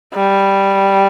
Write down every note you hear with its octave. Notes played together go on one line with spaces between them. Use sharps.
G3